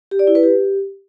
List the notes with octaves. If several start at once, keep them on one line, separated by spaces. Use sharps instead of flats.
G4
D5
E4
B4
G4